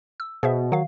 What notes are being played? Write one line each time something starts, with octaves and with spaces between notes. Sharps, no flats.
E6
B2 G#4 C5 E5
D#3 F#3 F5